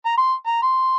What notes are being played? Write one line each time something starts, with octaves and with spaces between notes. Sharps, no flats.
A#5
C6
A#5
C6